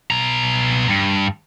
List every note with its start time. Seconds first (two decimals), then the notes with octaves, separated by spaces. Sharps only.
0.11 B2 A#5
0.89 G2